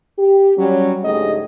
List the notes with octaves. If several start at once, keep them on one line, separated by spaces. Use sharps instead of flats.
G4
F#3 G3 C#4
D2 G#2 A3 G4 G#4 D#5